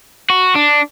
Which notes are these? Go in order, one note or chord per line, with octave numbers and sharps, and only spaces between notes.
F#4
D4